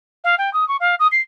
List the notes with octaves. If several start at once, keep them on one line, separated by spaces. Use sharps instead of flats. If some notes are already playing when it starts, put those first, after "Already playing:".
F5
G5
D#6
C#6
F5
D#6
C7